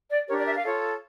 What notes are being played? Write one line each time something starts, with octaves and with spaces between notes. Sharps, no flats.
D5
D4 G4 A#4 C#5
D5
E5
F5
F4 A4 C#5